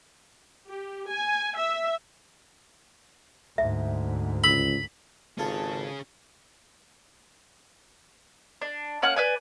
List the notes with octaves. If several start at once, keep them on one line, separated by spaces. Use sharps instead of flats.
G4
G#5
E5
D2 G#2 E5
C#2 B5 E6
G#1 C#4 F4 G#4 A4 C#5 A5
D4
A#3 C#4 F#5 F#6
B4 D5 G#5